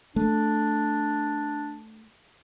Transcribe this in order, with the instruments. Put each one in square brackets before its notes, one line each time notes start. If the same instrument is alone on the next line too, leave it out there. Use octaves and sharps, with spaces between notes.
[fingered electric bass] A3 [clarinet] D4